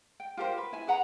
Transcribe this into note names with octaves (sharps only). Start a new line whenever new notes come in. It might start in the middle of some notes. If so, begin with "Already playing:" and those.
G5
F4 G4 A#4 C5
B4
E4 G#5
G#4 B4 F#5 A#5